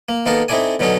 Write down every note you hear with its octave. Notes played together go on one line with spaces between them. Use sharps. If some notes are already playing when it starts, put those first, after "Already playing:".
A#3
D#3 A#3 B3 A4 A#4 A5
C4 D#4 E4 A4 D5 G#5
B2 D3 F#3 C#4 D#4 A4